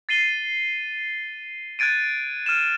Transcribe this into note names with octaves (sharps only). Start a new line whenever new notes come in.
A6 C7 D#7 G7
F#6 G#6 A6 D7 D#7
F6 D#7 E7